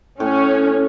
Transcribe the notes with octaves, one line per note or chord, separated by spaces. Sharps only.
A2 C#4